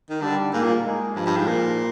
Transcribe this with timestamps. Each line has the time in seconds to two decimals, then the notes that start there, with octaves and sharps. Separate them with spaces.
0.09 D#3
0.21 D3 G3
0.53 G#2 A#3
0.63 A#2
0.84 G#3
1.16 G2 F3
1.26 G2
1.37 G#2
1.47 A#2